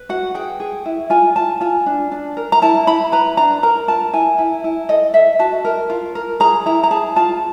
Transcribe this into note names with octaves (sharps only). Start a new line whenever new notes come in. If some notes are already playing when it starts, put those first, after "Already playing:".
Already playing: B4
F#4 F#5
G#4 G5
G#4
E4
F4 G#5
F4 A5
F4 G#5
D4
D4
A#4
A#5
E4 A5
E4 B5
B4 A#5
D4 A#5
A#4 A#5
F4 A5
E4 G#5
E4
E4
A4 D#5
A4 E5
F#4 A5
A#4
F4
A#4
G#4 A#5
E4 A#5
A#5
G#4 A5
F4 A5